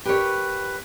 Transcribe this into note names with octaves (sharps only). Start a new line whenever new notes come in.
G4 A#4 B4 C#5